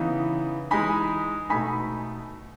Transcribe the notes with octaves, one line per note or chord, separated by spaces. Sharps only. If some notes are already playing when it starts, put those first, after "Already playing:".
Already playing: C#3 E3 B3 D#4
E3 G#3 D#4 G#5 B5
B2 A3 D#4 G#5 B5